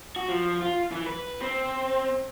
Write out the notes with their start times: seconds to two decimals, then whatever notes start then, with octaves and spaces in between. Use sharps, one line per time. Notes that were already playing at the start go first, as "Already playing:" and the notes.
0.16 F#4
0.29 F3
0.62 F4
0.92 E3
1.06 B4
1.41 C4